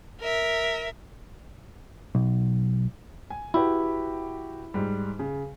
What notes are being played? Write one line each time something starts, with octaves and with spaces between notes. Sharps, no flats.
A#4 E5
B1
G#5
E4 F#4 G4 B4
G#2 G3
C#3